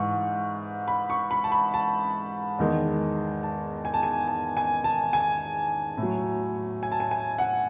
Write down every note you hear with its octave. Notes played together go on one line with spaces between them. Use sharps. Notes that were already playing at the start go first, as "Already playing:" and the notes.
Already playing: G#2 E3 G#3 C#6
B5
C#6
B5
A5
B5
A5
E2 D#3 G#3
A5
G#5
A5
G#5
A5
G#5
A5
G#5
A2
F#3
G#5
A5
G#5
G#5
F#5